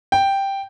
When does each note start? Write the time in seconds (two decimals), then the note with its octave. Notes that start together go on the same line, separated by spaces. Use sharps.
0.12 G5